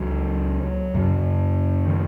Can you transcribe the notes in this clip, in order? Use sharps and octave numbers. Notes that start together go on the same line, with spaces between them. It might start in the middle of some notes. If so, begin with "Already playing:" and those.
Already playing: C#2 C#3 F#3
F#2 C#3
D#3